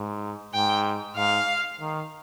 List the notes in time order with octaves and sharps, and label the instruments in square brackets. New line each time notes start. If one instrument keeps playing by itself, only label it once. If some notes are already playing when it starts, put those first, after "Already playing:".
Already playing: [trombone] G#2
[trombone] G#2 [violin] G5
[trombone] G#2 [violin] F5
[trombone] D#3